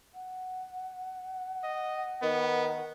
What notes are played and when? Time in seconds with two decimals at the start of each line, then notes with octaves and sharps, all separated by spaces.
0.14 F#5
1.64 D#5
2.22 D#3 B3